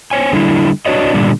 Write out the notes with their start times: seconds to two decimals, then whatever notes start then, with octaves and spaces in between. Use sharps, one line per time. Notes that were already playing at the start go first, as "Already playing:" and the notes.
0.11 C5 C#5 G#5
0.33 D3 G3 E4
0.86 D4 F#4 B4 C#5 D#5
1.14 A#2 D3 G3